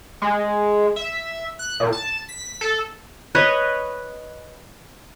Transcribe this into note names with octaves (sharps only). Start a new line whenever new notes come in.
G#3
E5
F#6
A#2
A5
B6
A4
B4 C#5 D#5